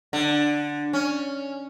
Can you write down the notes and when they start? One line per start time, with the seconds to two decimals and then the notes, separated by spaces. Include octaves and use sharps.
0.13 D3
0.93 C#4